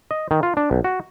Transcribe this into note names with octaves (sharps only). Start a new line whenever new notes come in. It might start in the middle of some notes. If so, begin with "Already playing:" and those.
D#5
D#3
F4
D4
B1
F#4